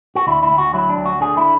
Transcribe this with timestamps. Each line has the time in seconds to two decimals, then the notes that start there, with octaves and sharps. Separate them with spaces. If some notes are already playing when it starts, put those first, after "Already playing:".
0.15 F#4
0.27 D2 E4
0.43 E4
0.51 D2
0.58 F#4
0.73 F#3 E4
0.89 D4
0.97 D2
1.05 F#4
1.21 D3 G#4
1.37 E4